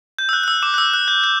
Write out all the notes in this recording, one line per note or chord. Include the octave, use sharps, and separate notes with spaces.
G6
E6
F#6
F#6
E6
D6
F#6
E6
F#6
G6
G6